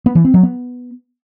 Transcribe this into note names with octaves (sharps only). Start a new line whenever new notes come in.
B3
E3
C4
F#3
B3